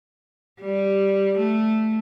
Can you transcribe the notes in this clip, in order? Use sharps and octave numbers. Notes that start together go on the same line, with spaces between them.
G3
A3